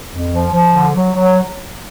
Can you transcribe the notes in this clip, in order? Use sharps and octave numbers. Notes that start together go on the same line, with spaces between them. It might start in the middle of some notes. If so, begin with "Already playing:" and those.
F2
F3
F3
D3
F#3
F#3